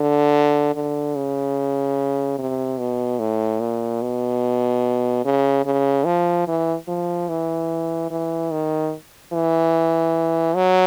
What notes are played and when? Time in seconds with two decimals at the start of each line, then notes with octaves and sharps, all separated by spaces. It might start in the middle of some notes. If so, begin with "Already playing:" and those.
Already playing: D3
0.75 D3
1.16 C#3
2.39 C3
2.79 B2
3.20 A2
3.60 A#2
4.02 B2
5.25 C#3
5.65 C#3
6.06 F3
6.48 E3
6.88 F3
7.29 E3
8.11 E3
8.51 D#3
9.33 E3
10.56 F#3